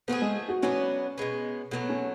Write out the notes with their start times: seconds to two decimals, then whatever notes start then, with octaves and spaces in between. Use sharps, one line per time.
0.08 F3 A3 B3 F4 G#4
0.22 G#3
0.48 F#4
0.62 B2 F#3 B3 C#4 D4
1.18 B2 G#3 B3
1.71 B2 F#3 A3 B3
1.89 C#4